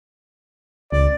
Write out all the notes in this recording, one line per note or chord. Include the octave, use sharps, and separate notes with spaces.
C#2 D5